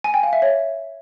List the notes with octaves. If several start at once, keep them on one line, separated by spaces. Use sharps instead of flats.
G#5
G5
F5
E5
C#5